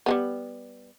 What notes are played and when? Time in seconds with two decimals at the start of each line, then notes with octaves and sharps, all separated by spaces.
0.06 G3 G#3 B3